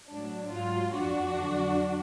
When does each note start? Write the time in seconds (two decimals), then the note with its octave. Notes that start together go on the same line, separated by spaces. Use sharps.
0.11 A2 F#3 D4
0.52 G#2 F#3 F4
0.93 F2 F3 D4 F#4
1.34 F2 D3 F#3